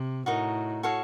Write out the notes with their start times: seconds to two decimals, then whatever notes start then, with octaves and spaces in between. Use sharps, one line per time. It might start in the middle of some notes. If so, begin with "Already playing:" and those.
Already playing: C3
0.26 A2 D#4 F#4 A#4 D#5
0.83 F#4 A4 C#5 F5